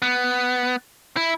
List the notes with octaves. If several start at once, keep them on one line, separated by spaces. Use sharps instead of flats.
B3
E4